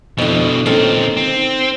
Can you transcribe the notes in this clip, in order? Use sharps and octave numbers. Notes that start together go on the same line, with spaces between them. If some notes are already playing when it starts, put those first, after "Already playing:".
F2 B2 D3 E4
A#2 D#3 C4 C#4 A4
C4